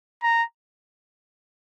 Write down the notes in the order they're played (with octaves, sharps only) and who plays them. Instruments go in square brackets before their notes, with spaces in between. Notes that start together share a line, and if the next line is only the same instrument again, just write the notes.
[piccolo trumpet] A#5